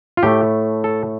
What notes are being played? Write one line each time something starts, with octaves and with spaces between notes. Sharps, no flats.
F4
A2 A3 G4
A4